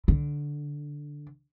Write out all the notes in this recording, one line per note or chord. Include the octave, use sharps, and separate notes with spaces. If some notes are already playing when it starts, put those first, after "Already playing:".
D3